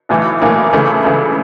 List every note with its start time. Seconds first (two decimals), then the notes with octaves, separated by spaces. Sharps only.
0.09 B1 A2 E3
0.41 B1 A2 E3 A#3
0.73 C#2 C#3 E3 A3
1.05 C#2 C#3 E3